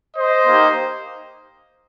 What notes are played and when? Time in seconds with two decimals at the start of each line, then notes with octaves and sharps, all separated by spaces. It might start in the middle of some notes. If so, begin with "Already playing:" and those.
0.16 C5 D#5
0.47 A#3 D#4 G4